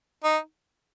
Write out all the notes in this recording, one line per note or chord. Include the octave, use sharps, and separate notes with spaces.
D#4